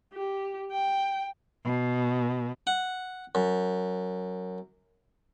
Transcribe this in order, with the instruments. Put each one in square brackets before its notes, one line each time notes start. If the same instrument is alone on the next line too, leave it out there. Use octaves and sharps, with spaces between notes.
[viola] G4
G5
[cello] B2
[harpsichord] F#5
F#2